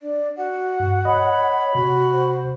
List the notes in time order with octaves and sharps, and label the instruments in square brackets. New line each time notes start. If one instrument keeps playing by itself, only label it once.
[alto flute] D4 [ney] D5
[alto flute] F#4 [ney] F#5
[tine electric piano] G2
[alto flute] C#5 [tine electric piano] D#5 [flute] B5
[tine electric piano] C3 [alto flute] F#4
[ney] C5